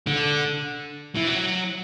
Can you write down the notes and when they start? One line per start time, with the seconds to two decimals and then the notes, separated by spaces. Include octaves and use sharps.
0.07 D3
1.15 E3
1.27 F#3